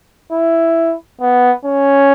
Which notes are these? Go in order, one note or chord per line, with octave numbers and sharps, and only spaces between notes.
E4
B3
C#4